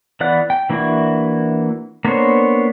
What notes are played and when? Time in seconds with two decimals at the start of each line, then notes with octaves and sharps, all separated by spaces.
0.20 E3 B3 D5 F#5 F#6
0.50 G5
0.70 E3 A#3 D4 E4 F#4
2.05 A#3 B3 D4 C5 C#5